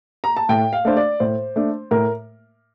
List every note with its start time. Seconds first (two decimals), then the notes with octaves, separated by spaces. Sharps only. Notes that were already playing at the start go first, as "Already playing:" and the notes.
0.24 A#5
0.37 A5
0.49 A2 G5
0.73 F5
0.85 A3 D4 C5
0.97 D5
1.20 A2 C5
1.56 A3 D4
1.91 A2 A#4